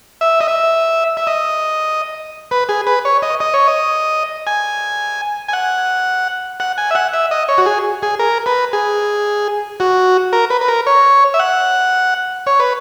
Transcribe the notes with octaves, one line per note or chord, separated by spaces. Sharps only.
E5
D#5
E5
E5
D#5
B4
G#4
B4
C#5
D#5
D#5
C#5
D#5
G#5
G#5
F#5
F#5
G#5
E5
F#5
E5
D#5
C#5
F#4
G#4
G#4
A#4
B4
G#4
F#4
A#4
B4
B4
A#4
C#5
E5
F#5
C#5
B4